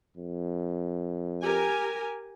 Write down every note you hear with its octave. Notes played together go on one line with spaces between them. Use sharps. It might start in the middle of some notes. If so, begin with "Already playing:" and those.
F2
G4 A#4 G#5